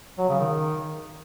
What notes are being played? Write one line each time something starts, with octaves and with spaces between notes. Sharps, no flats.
F#3
C#3
D#3